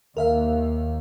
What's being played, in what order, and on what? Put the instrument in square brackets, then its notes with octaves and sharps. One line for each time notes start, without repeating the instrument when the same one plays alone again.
[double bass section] D#2 [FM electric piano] A#4 E5 F5